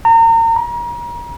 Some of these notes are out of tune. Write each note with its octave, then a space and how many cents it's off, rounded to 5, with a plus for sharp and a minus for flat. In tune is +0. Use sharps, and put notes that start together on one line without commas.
A#5 -35
A#5 +35